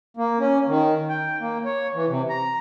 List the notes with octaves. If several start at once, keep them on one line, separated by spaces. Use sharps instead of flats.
A#3
C#4
D#3
G5
A#3
C#5
E3
C3
A#5